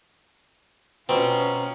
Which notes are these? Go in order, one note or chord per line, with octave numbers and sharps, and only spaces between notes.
B2 C4 C#4 F4 A#5